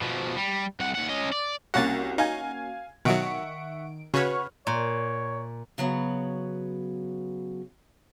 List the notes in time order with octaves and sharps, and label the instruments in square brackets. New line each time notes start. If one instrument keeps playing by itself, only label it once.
[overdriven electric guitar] B2 F3
G3
C2 F#5
D#2 F#5
C#4 D#5
D5
[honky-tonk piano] C2 A#6 [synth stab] A#3 C#4 F#4 [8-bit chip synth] F#5 A6
[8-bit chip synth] D#4 [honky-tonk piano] F5 G#5 G#6
[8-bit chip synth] B2 F#3 [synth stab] D#3 D7 [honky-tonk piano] E5 F#5 C#6
[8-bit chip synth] C#3 [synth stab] F#4 B4 C#5 [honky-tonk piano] C#6 F6
[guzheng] A#2 [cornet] C#5
[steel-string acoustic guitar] C#3 F#3 B3